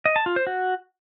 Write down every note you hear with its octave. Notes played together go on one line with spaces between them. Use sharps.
D#5
A5
F4
C5
F#4